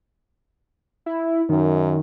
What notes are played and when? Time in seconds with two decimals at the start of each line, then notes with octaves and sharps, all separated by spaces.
1.06 E4
1.49 F#2 D#3